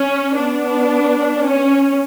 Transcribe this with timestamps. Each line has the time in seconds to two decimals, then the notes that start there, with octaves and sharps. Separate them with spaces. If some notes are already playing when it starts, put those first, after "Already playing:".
Already playing: C#4
0.36 B3 D4
1.45 C#4